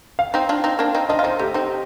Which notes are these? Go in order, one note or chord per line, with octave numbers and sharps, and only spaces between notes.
F5
C4 D#4
D4 F4
C4 D#4
A#3 D4
C4 D#4
D4 F4 D#5
F4
C4 D#4 C5
A3 G4
C4 D#4